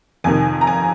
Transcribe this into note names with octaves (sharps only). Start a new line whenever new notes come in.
F2 C3 D#3 G#5
A#5
G#5